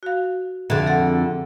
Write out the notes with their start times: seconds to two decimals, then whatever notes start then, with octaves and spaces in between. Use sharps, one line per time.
0.03 F#4 F5
0.70 F2 D3 G#4 E5
0.87 A4 F#5